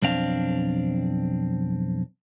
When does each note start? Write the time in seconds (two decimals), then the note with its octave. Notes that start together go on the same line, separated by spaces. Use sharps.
0.02 B1 F2 C4 D4 F5